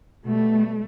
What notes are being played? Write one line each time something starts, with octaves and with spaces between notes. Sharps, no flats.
B2 G3 A3